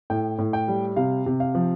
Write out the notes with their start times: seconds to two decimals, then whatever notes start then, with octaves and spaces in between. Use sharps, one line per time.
0.10 A2 G5
0.39 A2
0.53 G5
0.68 G3
0.96 C3 F5
1.26 C3
1.40 F5
1.55 F3